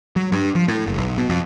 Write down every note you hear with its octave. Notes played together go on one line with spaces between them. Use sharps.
F#3
G2
F3
A2
F#1
B1
B2
F2